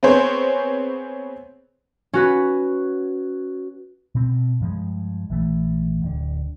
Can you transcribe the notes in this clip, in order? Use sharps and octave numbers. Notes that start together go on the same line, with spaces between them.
B3 C4 G#4 C5 C#5
C#4 F#4 B4
B2 C4
G2 F3 G#3
A#1 E3 A3
D1 D3